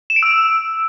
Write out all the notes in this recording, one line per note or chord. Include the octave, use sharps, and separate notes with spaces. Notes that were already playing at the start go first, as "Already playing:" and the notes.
E7
D7
E6